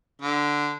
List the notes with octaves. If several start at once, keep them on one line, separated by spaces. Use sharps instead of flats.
D3